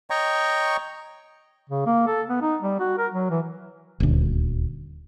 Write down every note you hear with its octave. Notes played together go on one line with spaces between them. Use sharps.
C#5 D#5 G5 A#5 C#6
C#3
A#3
A4
B3
D#4
G3
F#4
A#4
F#3
E3
D#1 D2